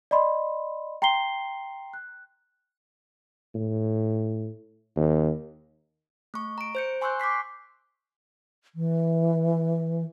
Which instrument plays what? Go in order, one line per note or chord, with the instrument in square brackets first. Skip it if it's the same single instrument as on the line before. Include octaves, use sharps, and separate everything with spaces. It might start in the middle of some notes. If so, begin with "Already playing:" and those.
[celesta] D5 D#5 B5 C6
G5 A#5 C6 C7 G7
F#6
[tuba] A2
D#2
[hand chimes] A3 C#6
A#5 D7
C5 G6 C#7
G#5 C6 C#6 E6 F#6 G6
D6 G6 B6 C7
[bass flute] E3